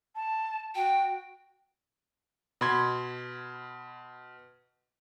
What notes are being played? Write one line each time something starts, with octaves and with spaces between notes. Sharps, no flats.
A5
F#4 G5
B2 B5 C6 G#6